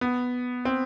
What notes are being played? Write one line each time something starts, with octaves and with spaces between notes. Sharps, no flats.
B3
C4